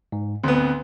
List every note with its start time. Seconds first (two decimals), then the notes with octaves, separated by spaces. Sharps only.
0.12 G#2
0.44 D2 B3 C4